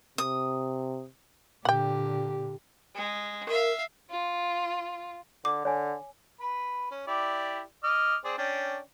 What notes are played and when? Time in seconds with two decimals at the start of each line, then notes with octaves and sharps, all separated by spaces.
0.18 C3 D#6
1.65 A#2 D3 G4 F#5 G5
2.95 G#3
3.48 A#4 E5 F5
4.10 F4
5.45 D3 D6
5.65 D3 C#5 G#5
6.41 B4 B5
6.91 C#4
7.07 E4 G4 D5
7.84 D#5 D6 F6
8.24 C4 G#4 D5
8.38 C#4 D4 G5